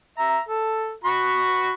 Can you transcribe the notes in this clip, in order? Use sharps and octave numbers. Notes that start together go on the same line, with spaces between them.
E5 A#5
A4
F#4 B5 C#6